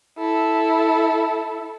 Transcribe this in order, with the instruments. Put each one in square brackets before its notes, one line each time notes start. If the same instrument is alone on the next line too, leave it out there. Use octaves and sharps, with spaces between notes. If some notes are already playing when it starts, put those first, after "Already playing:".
[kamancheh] E4 A4